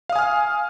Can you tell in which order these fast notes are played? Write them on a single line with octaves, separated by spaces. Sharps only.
F5 D#6 G#5 F6